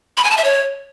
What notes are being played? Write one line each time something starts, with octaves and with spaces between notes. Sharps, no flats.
B5
G#5
A5
E5
C#5